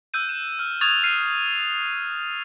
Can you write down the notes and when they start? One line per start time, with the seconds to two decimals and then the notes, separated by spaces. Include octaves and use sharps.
0.14 E6 F#6 G6 D#7
0.29 E7
0.59 F6
0.81 C#6 D#6 F#6 G#6 A6 F7
1.03 F6 C7 D#7